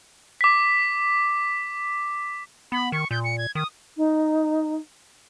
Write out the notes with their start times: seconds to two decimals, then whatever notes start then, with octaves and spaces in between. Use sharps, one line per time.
0.41 D6 B6
2.72 B3 B5
2.92 D#3 C#6
3.11 A#2 G6
3.24 C#7
3.38 G#6
3.55 D#3 D#6
3.97 D#4